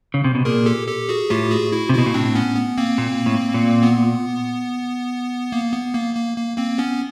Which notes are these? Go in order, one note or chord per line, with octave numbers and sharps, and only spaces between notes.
C#3
C3
B2
A#2 G#4 A#4
G4 A4
G4 A4
F#4 G#4
A2 F4 G4
F#4 G#4
E4 F#4
C3
B2 E4 F#4
A#2
A2 C4 D4
B3 C#4
B3
A#3 C4
A#2
A2
A#2
B3
A#3
B3
A#3
A#3
A#3
A#3 C4
B3 C#4